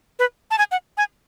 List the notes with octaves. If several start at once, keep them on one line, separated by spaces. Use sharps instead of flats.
B4
A5
G#5
F#5
G#5